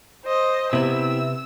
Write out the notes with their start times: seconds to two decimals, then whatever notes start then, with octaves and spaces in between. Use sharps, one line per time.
0.24 C5 D#5
0.73 C3 B3 C4 E4 E6